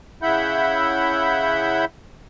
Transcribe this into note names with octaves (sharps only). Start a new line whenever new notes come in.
C#3 E4 E5 F#5 B5 G6